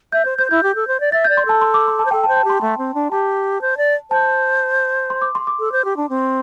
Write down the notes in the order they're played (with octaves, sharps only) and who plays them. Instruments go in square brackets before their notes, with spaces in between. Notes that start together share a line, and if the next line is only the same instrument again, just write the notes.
[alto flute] E5 [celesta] G6
[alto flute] C5 [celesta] G6
[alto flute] C5 [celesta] G6
[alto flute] E4 [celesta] G6
[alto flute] G4
A4
C5
D5
[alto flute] E5 [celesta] A6
[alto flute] D5 [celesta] G6
[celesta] C6
[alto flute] A4 [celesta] A5
[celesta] C6
D6
C6
A5
[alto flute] C5
[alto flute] A4 [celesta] G5
[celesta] A5
[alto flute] C5
[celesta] A5
[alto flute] G4
[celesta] C6
[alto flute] A3 [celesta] C6
[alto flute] C4
D4
[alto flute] G4 [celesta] A5
[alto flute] C5
D5
[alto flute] C5 [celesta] A5
[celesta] C6
D6
C6
D6
[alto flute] A4
C5
G4
D4
C4